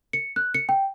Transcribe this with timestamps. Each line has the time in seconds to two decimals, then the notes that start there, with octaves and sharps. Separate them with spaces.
0.13 C#7
0.36 F#6
0.54 C#7
0.69 G5